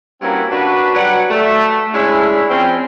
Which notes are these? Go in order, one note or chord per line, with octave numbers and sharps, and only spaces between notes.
G2 A#3 C4 C#4 E4 F#4
D4 F#4 B4
F#3 G3 B4 D5 F#5
A3
G#3 C#4 D4 E4
F3 C4 C#4